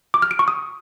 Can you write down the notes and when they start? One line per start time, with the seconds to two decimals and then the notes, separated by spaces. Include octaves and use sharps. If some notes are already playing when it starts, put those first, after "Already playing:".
0.14 D6
0.22 F6
0.31 D7
0.39 C#6
0.48 D#6